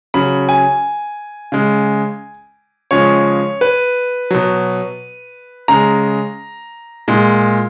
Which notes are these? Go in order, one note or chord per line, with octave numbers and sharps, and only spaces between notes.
C#3 F#3 B5
G#5
C#3 G#3
C#3 F3 G#3 C#5
B4
B2 F#3
C#3 G#3 A#5
A#2 G#3